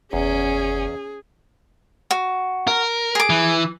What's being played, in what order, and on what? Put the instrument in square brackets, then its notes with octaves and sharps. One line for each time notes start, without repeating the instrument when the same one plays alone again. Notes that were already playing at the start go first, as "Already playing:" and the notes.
[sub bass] F#1 [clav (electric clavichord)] E2 [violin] C#4 [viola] G#4
[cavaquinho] F#4
[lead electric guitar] A#4
[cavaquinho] G#4 D6
[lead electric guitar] E3